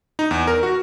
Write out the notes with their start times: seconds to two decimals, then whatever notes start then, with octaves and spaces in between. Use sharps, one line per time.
0.19 D#4
0.31 E2
0.47 A#4
0.63 F#4